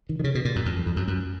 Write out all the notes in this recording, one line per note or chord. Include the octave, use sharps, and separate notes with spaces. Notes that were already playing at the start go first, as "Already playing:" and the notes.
D#3
D#3
C#3
B2
A#2
F#2
F2
F2
F2
F#2
F#2